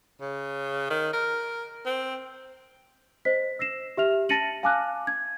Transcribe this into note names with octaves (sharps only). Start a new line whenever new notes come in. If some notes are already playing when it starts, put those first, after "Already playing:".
C#3
D#3
A#4
C4
C5 D#5 B6
E6 A#6 C7 E7
G4 E5 F6 F7
A5 A6 A#6 C#7 D#7 F#7
F5 G#5 A5 D6 F6 F#6
G#6